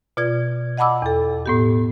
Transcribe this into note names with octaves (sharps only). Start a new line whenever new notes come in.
B2 F4 D5 G#6
D#5 F#5 A5 B5 D6 E6
E2 A4
A2 B3 G4